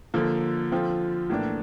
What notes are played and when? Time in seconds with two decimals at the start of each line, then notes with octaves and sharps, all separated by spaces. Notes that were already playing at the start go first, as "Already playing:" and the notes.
0.14 D3 F3 A#3
0.72 D3 F3 C4 F4
1.30 A2 E3 A#3 D4